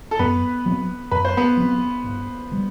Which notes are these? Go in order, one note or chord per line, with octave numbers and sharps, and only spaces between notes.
A4
F#2 B3 B4
F#3 A3 C4
F#2 B4
C5
B3 B4
F#3 A3 C4
G1
E3 G3